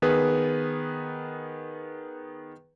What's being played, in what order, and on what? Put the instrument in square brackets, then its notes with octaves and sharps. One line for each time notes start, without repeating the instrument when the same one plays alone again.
[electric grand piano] D#3 B3 G#4 B4